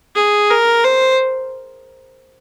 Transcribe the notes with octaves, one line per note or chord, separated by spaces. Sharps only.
G#4
A#4
C5